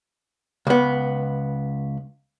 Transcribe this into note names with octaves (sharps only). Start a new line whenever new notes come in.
C#2 B3